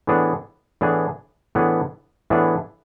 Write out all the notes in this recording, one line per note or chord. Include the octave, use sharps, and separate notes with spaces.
A2 E3 B3 D4 G#4
A2 E3 B3 D4 G#4
A2 E3 B3 D4 G#4
A2 E3 B3 D4 G#4